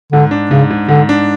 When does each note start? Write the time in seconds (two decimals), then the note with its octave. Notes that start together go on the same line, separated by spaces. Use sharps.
0.13 G#2 D3
0.31 D4
0.51 G#2 C#3
0.71 G#2
0.89 G#2 D3
1.09 D4